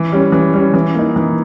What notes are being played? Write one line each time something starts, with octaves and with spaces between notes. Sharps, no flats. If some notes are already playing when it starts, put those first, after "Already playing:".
Already playing: E3
G3 C#4
E3
G3 C#4
E3
A#3 D#4
E3